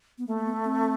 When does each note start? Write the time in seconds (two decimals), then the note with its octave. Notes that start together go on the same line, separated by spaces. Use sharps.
0.18 B3
0.26 A3 A#3
0.38 A#3
0.45 B3
0.64 C4